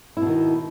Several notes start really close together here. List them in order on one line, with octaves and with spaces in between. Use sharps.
E4 B2 D#3